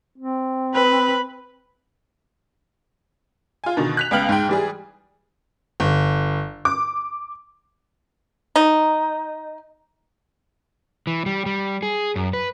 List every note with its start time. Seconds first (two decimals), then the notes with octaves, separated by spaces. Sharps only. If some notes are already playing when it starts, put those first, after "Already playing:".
0.18 C4
0.74 B4 B5
3.64 F4 G#5
3.77 B2 D3 D#3
3.97 F#6 B6 F7
4.11 C#2 B3 F5 G5 F6 F#7
4.29 G#2 G5
4.49 E3 G3 G#4
5.80 G1
6.65 D6
8.56 D#4
11.07 E3
11.26 G3
11.46 G3
11.83 G#4
12.16 F#2
12.33 B4